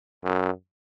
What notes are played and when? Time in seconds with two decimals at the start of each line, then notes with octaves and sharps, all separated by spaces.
0.24 F#2